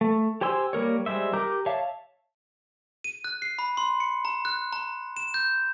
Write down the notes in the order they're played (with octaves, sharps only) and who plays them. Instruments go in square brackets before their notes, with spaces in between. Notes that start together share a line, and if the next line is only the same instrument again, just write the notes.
[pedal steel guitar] A3
G4 C5 G#5 C6 E6
G3 A#3 A#4 C#5
G3 G#3 C5 E5
G4 A#4 A#5 D6 G6
C#5 E5 F5 A5
[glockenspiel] D#7
F#6
C7
B5
C6
C#7
A#5
F#6
A#5
E7
G6